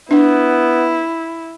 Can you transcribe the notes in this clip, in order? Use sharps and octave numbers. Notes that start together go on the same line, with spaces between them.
B3 D4 E4